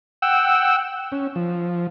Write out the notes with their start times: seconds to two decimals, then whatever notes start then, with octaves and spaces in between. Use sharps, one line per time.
0.22 F#5 G5 E6
1.12 C#4
1.36 F3